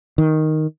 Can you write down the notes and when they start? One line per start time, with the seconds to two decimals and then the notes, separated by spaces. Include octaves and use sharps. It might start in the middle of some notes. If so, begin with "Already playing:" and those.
0.18 D#3